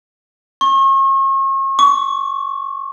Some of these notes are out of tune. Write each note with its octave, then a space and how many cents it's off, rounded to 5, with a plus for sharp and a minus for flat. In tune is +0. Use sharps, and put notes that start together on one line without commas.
C#6 -40
C#6 +35